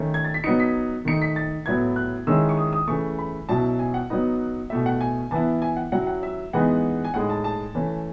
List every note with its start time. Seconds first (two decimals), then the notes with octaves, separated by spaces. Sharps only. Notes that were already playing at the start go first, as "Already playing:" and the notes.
Already playing: D#3 A3 C#4
0.14 G#6
0.24 A6
0.34 B6
0.44 F#3 B3 D#4 C#7
0.60 B6
1.05 D#3 A3 D#4 C#7
1.22 B6
1.36 A6
1.66 A2 F#3 B3 E4 G#6
1.96 F#6
2.27 D#3 G#3 C#4 E4 E6
2.49 C#6
2.57 D#6
2.73 D#6
2.87 C#3 E3 A3 C#6
3.19 B5
3.49 B2 F#3 C#4 E4 A5
3.79 G#5
3.94 F#5
4.10 F#3 B3 D#4
4.70 B2 A3 E4 E5
4.86 F#5
5.01 G#5
5.31 E3 B3 E4 A5
5.62 G#5
5.77 F#5
5.92 F#3 C#4 E4 F#5
6.07 F#5
6.23 E5
6.53 E3 G#3 B3 D#4 F#5
7.05 G#5
7.14 A2 G#3 D#4 F#5
7.30 A5
7.44 A5
7.75 E3 A3 C#4